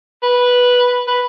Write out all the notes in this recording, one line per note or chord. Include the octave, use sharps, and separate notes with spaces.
B4
B4